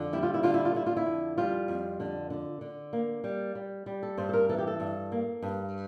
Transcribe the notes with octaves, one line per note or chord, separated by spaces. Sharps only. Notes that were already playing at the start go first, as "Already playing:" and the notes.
Already playing: F2 D3
G3 E4
F4
E4
D3 F4
E4
F4
D3 E4
F4
E4
F2
G3 F4
F2
D3
D3
D3
A#3
G3
G3
G3
A4
G2 C5
A4
A#4
E3 A4
G4
A4
G2
A#3
G2